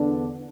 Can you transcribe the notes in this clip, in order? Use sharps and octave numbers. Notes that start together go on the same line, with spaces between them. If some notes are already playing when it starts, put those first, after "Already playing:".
Already playing: E2 D3 B3 D4